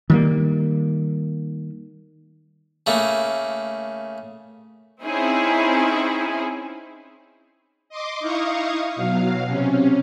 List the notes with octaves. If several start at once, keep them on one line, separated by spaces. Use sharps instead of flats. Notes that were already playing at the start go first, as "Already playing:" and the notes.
D#3 G3 A#3
C#3 A3 A#3
C4 C#4 D#4 E4 G#4
D#5 C6 D6
D#4 E4 F5 C#6 D#6
B2 F#3 F5
C3 C#4